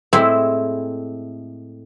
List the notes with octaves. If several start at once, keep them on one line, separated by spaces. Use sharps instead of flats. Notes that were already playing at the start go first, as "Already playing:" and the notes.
A2 G#3 C4 E4 E5 G5